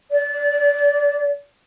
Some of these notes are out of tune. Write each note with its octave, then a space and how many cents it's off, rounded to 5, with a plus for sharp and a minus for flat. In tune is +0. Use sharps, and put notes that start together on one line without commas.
D5 -25